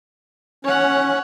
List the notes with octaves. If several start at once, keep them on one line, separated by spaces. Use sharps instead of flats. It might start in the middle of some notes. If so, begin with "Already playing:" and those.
C#4 C#5 F#5